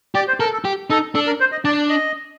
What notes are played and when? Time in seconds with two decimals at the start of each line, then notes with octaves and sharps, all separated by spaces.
0.15 G4 D5
0.28 C5
0.40 A4 A#4
0.53 A4
0.65 G4
0.90 D#4 A4
1.15 D4 A4
1.27 A#4
1.40 C5
1.52 D#5
1.64 D4 D5
1.89 D#5